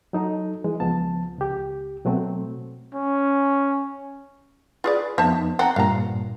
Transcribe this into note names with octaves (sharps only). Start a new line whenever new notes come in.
F#3 D#4 A4
E3 G#3
C#2 F3 B3 A5
C#2 G4
B2 F#3 A3 C4
C#4
F4 G#4 B4 D5
F2 B3 D#4 C5 E5 A5
C4 F#5 A5 A#5
G2 A#2 F5 A#5